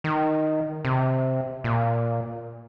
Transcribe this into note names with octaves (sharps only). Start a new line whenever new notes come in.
D#3
C3
A#2